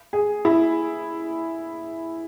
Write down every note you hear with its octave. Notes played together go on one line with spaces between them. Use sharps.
G#4
E4